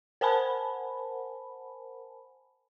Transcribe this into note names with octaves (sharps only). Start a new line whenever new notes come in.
A#4 C5 F#5 G#5 A5 B5